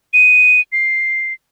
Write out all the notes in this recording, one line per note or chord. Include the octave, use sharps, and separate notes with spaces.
D#7
C7